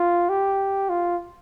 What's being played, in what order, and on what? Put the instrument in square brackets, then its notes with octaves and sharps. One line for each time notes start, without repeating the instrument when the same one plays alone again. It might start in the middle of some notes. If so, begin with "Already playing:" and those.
Already playing: [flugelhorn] F4
G4
F4